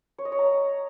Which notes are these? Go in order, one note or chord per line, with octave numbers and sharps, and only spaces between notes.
C#5
D#5
C#5
A#5